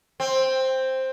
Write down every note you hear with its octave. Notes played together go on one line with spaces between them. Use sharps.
C4